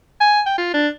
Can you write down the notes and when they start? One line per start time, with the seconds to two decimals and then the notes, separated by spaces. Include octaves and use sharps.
0.20 G#5
0.46 G5
0.58 F4
0.74 D4